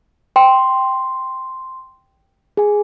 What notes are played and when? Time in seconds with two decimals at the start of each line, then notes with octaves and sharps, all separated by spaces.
0.36 G5 C6
2.57 G#4 G#5